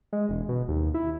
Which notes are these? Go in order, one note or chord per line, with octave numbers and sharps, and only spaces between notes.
G#3
E1
B2
D#2
E4